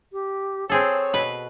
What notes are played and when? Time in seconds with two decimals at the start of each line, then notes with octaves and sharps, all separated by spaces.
0.13 G4
0.69 C4 G#4 A4 C#5
1.14 B2 B4